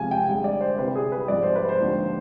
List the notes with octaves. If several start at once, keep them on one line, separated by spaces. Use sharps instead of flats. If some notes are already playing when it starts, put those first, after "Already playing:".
Already playing: F2 C3 F3 G#3 G#5
G5
G2 D3 G#3
D5
C5
C2 C3 G3 B4
G#4
B4
G#2 F3 G#3 D5
C5
B4
C5
D#2 D3 F3 G#3